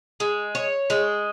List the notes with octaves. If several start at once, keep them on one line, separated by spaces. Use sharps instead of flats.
G#3
C#5
G#3